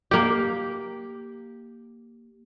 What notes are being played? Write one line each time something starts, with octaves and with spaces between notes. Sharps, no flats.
A#3 G4